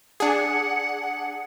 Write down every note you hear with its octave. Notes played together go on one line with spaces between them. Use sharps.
D4 G#4 F#5